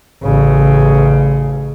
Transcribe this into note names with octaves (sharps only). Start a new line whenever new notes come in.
A1 C#3